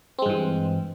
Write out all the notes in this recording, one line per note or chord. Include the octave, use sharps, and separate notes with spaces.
G2 E3 G#3 C4